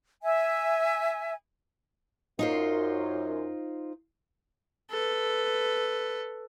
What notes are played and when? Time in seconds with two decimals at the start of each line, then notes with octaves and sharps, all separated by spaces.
0.23 E5 G#5
2.39 F#2 D#4 F4 C5
4.90 A4 B4